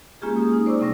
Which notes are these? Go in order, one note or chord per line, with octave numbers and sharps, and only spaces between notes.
G#3 A#3 C#4 F4 G4 G#4
D#6
D#4
C5 D5 C#6 D6 E6
C3 G3 C#4 A#6